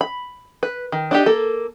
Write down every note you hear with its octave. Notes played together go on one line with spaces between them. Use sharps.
B5
B4
D#3
D4 D#4 G4
A#3 A4